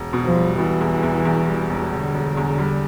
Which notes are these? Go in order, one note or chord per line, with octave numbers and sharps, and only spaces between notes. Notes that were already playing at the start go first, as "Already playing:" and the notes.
Already playing: E1
B2
F3
G3
B2 E3
E2
E2
E2
G3
E1
E1 D3
E1
E2
G3